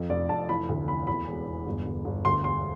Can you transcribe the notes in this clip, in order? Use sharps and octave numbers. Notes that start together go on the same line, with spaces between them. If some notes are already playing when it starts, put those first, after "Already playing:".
Already playing: F2 F3
F1 D5
F1 A5
E3 B5
D2
E3 B5
E2 B5
E1
E1
G1
G1
G1
D2 C6
E1 C6